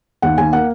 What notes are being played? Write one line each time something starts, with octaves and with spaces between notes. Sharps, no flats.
D#2 F#5
D#2 G#5
A#3 F#5